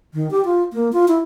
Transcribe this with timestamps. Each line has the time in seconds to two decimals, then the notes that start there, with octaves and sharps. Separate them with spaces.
0.14 D#3
0.31 G4
0.45 F4
0.73 A#3
0.93 F4
1.08 E4